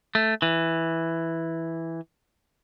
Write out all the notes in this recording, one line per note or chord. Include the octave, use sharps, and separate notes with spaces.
A3
E3